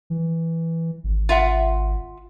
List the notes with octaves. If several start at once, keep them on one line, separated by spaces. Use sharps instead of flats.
E3
G#1
F4 E5 F#5